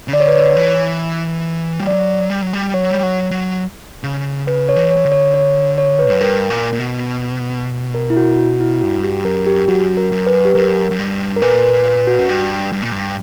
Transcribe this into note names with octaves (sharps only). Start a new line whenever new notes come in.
C#3
D3 D5
C#5
B4
C#5
E3
G3
F#3 D5
G3
F#3
G3
F#3 C#5
G3
F#3
F#3
C#3
C#3 B4
C#5
E3
C#5
E3
D3
C#5
C#5
C#5
B4
F#2
G2 A#4
A#2
A#2
B2
A#4
E4
F#4
F#4
E4
G2 F#4
G4
F#2 A#4
G4
F#2 F#4
A#4
F#2
B4
G4
F#2 A#4
F#2
G2
A#4
A#2 B4
B4
B4
F#4
F#2
G2
G2
A#2
G2